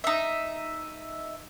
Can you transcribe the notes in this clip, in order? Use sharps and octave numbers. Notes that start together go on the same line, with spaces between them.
D#4 E5